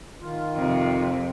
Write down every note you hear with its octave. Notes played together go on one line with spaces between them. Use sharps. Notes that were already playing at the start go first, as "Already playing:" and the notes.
D#3 F4
F2 C3